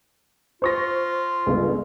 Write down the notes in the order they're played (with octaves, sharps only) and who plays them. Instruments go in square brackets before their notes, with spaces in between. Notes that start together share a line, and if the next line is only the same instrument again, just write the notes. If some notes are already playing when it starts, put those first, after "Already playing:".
[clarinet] F4 [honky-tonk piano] C5 C#6 A#6
[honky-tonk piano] G1 C#2